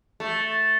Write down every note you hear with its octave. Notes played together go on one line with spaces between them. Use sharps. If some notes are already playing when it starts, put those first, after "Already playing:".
A3